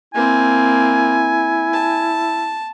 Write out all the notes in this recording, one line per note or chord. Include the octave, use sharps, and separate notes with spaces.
A#3 C4 E4 G#5
A5